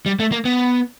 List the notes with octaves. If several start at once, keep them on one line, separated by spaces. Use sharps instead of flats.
G3
A3
A#3
B3